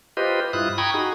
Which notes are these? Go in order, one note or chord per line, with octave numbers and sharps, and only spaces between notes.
F4 G4 B4 C5 D#5
G2 E4 F4 D#6 F#6
G5 A#5 B5 C#6 D#6 G#6
D#4 F#4 G#4